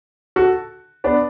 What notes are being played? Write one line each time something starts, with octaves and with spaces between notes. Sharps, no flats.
F#4 A4
B3 D4